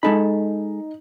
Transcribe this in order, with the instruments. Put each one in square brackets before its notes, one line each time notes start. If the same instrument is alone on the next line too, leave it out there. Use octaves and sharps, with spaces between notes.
[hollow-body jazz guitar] G#3 A4 B5 [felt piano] D#4